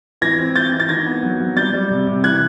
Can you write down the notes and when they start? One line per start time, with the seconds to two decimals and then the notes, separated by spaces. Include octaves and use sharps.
0.21 E3 G#6 A#6
0.39 C4
0.56 C4 G6 A6
0.72 E3
0.80 A6
0.89 D#3 G#6 A#6
1.06 B3
1.23 F#3
1.40 F#3
1.56 G3 G6 A6
1.74 G3
1.90 C3
2.07 C3
2.24 E3 F#6 G#6